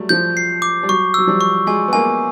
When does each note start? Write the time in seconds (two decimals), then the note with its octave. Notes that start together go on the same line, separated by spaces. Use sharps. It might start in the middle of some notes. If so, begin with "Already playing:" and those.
Already playing: F#3 G3 A3
0.09 F3 G6
0.37 C7
0.62 D6
0.83 G3
0.89 F#3 C#6
1.14 F#3 E6
1.27 F3 G3
1.41 C#6
1.67 F#3 G#3 G#5
1.88 B3
1.93 G#3 A#3 G#5